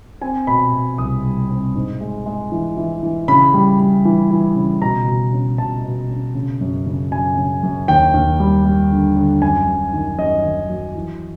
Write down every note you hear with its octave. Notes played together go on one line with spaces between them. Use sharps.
C4 G#5
B2 B5
B2
C2 D#6
G3
C4
G#2
G#3
G#3
E3
E3
E3
C#3 B5
G3
G3
E3
E3
C#3
B2 A#5
B2
C#4
B2 A5
B2
C#4
C#3
F#2
C#3
F#2 G#5
C#3
F#2
D#2 G5
D#2
G3
G3
D3
D3
F#2 G#5
F#2
D#3
F#2 D#5
D#3
F#3
E3